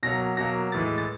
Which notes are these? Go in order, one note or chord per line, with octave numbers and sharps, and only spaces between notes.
B2 F#3 A#3 A#6
B2 F#3 A#3 A#6
A2 E3 G#3 A6
A6